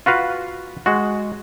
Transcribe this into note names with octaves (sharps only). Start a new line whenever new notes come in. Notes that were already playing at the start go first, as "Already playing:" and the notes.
F4 F#4 B4 F5
G#3 F#4